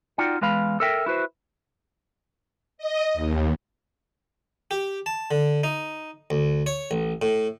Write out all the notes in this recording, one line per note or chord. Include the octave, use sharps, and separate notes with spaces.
D#4 F4 F#4 D5 F#5 G5
E2 G#3 B4 F5 B5
A4 A#4 E5 G5
E4 F#4 B4 C5
D#5
D#2
G4
A5
D3
D#4
D2
C#5
A1
A2